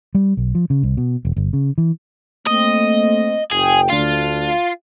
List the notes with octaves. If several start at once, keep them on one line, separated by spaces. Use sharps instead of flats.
G3
B1
F3
C#3
C2
B2
E1
G1
C#3
E3
A3 A#3 C4 D#5
F#1 G#4 G5
D2 D4 F4